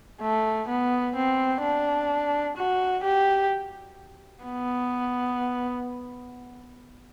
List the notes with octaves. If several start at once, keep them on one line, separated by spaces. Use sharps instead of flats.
A3
B3
C4
D4
F#4
G4
B3